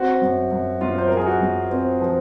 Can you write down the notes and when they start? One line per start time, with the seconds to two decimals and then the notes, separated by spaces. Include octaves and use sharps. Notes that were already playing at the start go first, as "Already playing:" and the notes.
Already playing: C4 F#4
0.22 F#2
0.51 F#2
0.81 F#2 F4
0.98 C5
1.08 F#2 A#4
1.17 G#4
1.26 F#4
1.41 F#2
1.71 C4
2.01 F3